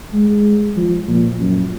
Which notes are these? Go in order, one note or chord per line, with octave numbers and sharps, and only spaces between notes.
G#3
F3
A#2
F#2